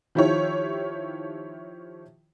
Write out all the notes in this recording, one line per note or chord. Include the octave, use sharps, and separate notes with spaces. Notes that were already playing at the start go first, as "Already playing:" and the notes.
D#3 F3 E4 G4 C#5